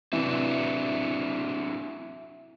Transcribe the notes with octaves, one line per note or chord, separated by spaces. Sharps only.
C3 E3 C4 D4 E4 F#4 E5